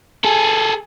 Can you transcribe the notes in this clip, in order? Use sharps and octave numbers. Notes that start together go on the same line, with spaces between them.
G#4 A4